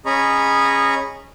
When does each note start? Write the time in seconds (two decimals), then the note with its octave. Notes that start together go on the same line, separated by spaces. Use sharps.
0.06 C#4 G#4 D#5 A#5 B5 C#6